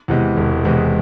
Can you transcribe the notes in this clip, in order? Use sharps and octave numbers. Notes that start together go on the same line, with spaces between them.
E2 C3 E3 G#3
E1
E2 C3 E3 G#3